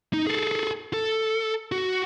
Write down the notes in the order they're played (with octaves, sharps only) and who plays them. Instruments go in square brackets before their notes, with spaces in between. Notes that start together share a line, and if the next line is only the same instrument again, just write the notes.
[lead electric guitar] D#4
G#4 A4
A4
F#4